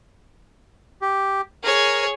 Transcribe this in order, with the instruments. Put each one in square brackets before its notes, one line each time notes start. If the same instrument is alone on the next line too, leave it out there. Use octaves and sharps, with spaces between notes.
[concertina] G4
[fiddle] G#4 C#5 [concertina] A#4